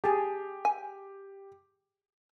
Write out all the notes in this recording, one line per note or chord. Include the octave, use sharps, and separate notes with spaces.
G4 G#4 A5
G#5